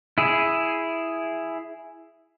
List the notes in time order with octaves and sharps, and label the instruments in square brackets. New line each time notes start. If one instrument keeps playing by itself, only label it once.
[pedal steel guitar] E4 G#4